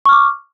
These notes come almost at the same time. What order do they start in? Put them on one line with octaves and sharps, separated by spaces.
C#6 F6 D6